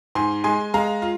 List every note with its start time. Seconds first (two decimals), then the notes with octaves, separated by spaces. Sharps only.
0.15 G#2 G#5 C6
0.44 G#3 G#5 C6
0.74 G#3 F5 A#5
1.02 F4